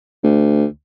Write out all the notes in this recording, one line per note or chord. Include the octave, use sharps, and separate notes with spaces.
D2